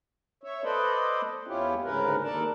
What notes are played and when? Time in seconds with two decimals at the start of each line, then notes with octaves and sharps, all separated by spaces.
0.44 C#5 E5
0.64 A4 B4 C5 D5 D#5
1.47 E2 C#4 E4 F4 G4
1.84 D2 G#2 C#3 C#4 A#4 B4
2.24 D#2 A4 A#4 D5 A5